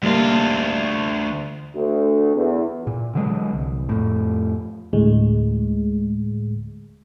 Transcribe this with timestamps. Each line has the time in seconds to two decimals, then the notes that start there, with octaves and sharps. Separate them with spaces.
0.03 D2 G3 A#3 F4
1.76 D2
2.35 E2
2.87 A#2
3.15 D3 E3 F#3 G#3
3.53 C2
3.89 F2 A2
4.93 D2 A2 G#3